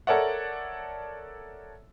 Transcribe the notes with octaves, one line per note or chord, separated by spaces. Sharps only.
A4 A#4 C#5 D5 E5 F#5